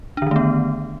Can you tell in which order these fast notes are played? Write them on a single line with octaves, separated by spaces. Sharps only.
D4 D3 D#3 A3 B3